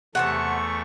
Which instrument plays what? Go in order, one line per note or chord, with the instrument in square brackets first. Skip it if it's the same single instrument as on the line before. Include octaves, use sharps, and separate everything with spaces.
[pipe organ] E2 A3 C#6 [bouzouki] C3 G#4 A5 [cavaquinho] F#5